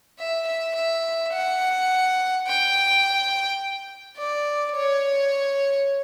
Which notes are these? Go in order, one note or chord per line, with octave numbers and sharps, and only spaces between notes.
E5
E5
E5
F#5
G5
D5
C#5